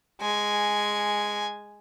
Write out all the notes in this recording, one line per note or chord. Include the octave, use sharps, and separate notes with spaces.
G#3 G#5